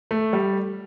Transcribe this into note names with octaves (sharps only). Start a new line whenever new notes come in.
A3
G3